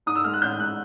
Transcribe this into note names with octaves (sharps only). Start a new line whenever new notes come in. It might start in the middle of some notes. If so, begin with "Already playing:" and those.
G#2 D#6
E6
G#3 F6
F#6
A1 G6
G#3 F#6